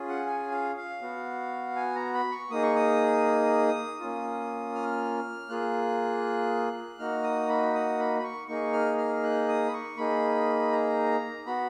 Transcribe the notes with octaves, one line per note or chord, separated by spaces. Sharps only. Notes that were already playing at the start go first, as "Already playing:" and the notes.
Already playing: C#4 F4 G#4
F#5
G#5
F5
F5
B3 F#4
G#5
A#5
B5
C#6
A#3 D#4 G#4 D#6
C#6
D#6
A#3 C#4 F4
F6
A#3 F4 G#4 F#6
A#3 D#4 F#4 F6
D#6
B5
D#6
B5
B5
C#6
A#3 D#4 G#4 C#6
F6
F6
F#6
D#6
B5
C#6
A#3 D#4 G#4 B5
A#5
B3 F#4 B5